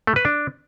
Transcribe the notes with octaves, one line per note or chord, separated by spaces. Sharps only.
A3
B4
D4